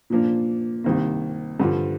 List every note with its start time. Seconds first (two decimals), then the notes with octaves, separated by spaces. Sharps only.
0.10 A#2 F3 A#3 D4
0.84 C2 C3 D#3 A#3
1.60 G2 D3 F3